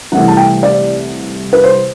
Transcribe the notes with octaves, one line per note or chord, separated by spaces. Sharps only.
C2 C3 E3 A3 F#5
A5
G5
D5
B4
C5